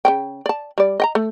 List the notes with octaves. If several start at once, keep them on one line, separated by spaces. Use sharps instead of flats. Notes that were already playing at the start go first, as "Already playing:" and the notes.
C#3 E3 G5
D5 A5
G3 D5
D#5 G5 A#5
A3